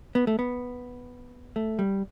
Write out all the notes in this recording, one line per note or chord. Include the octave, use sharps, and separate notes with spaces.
B3
A3
B3
A3
G3